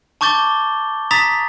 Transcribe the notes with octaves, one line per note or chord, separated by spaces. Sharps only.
A5 C#6 D6 G6 A6 G7
A#5 D#6 A6 B6 F7